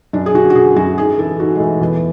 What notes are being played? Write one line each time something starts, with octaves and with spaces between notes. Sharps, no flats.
F#2 D4
G#4
D3 F#4
F#4
D3 G#4
F#2 F#4
G#2 G#4
E3 A4
G#2 F#4
G#3
E3 A3
E2